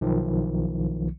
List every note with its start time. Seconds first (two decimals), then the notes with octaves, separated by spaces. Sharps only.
0.01 B1 D#3 F3